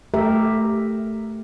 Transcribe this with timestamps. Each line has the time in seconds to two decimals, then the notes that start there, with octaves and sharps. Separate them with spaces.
0.14 A3 G4 A#4 E5